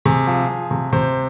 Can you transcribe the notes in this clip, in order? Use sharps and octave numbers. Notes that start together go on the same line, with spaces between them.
C3 G#4
F3
F3
C3
C3 C5